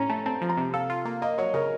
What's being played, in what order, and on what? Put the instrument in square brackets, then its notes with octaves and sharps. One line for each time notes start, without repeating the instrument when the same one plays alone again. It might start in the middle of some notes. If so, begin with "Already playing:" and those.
Already playing: [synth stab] A2 C#4 [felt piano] A#5
[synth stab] A3 [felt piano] A5
[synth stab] C4 [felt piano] A5
[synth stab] F3
[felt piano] A#5
[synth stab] C3
[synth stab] A4 [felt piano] F5
[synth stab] F4
A#3
[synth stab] A#3 [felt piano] D#5
[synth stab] F#3 [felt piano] C#5
[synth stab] C#3 [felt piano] A#4